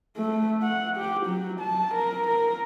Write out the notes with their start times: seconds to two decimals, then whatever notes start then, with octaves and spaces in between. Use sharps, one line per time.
0.17 A3
0.62 F#5
0.97 G4
1.26 F#3
1.60 A5
1.95 A#4
2.27 A#4